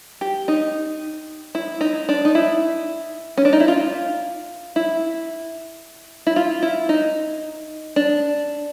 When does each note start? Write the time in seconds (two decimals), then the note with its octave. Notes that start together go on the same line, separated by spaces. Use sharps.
0.21 G4
0.48 D#4
1.55 E4
1.81 D#4
2.09 D4
2.25 D#4
2.35 E4
3.38 C#4
3.45 D4
3.53 D#4
3.60 E4
3.68 F4
4.76 E4
6.27 E4
6.36 F4
6.62 E4
6.89 D#4
7.96 D4